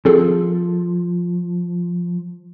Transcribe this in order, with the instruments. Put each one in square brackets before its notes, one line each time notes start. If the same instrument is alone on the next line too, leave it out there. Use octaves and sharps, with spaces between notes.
[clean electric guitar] F3 [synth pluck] C4 G#4 A4